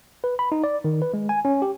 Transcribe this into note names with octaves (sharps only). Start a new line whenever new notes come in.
B4
B5
D#4
D5
D#3
B4
G#3
G#5
C#4
G4